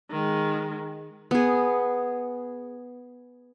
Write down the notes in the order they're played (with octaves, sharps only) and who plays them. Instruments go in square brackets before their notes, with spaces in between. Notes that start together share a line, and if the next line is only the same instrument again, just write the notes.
[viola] D#3 G#3
[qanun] B3 G#4